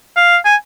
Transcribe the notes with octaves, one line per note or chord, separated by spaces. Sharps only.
F5
G#5